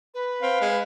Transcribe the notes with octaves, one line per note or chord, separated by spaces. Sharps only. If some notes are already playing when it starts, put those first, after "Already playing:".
B4
C4 F5
G#3